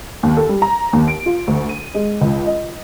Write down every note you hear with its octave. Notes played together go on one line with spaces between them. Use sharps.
D#2
A4
G3
A#5
D#2
D7
F4
D2
D#7
G#3
C#2
D#5